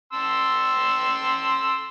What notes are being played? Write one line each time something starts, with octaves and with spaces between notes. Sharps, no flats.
A5 C6 E6